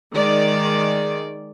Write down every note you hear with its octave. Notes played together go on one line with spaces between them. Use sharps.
D#3 G#3 D5